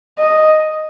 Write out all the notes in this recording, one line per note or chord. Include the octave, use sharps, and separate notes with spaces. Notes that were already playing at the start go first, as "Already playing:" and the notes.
D#5